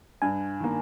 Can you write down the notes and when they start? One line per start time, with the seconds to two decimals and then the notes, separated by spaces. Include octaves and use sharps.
0.22 G2 G#5
0.60 D#3 A#3